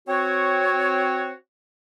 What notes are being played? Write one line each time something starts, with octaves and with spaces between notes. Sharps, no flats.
C4 F#4 C#5